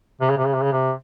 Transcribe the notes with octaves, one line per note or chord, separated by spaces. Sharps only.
C3
C#3
C3
C#3
C3
C#3
C3